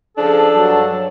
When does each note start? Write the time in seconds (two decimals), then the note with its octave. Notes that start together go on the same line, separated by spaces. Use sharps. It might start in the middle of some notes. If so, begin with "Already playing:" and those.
0.17 C#3 F3 D4 G#4 A4
0.56 G2 F#3